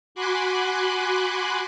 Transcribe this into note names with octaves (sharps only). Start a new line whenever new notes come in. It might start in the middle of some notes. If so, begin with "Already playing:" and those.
F#4 G#5 B5 C6 D6 F#6